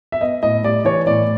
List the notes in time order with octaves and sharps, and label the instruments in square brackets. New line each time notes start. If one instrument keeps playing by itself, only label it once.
[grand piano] E5
B3 D#5
A2 D#5
G3 D5
E3 C#5
A2 D5